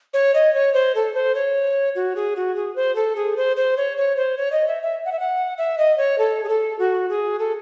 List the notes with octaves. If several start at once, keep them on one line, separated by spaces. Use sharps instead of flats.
C#5
D#5
C#5
C5
A4
C5
C#5
F#4
G#4
F#4
G#4
C5
A4
G#4
C5
C5
C#5
C#5
C5
C#5
D#5
E5
E5
F#5
E5
F#5
E5
D#5
C#5
A4
G#4
A4
F#4
G#4
A4